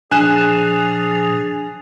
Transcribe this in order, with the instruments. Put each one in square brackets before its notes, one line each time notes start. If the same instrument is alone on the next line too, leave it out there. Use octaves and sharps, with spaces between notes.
[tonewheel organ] A#2 F3 [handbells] D4 [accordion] G#4 [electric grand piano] G#5 F#6 E7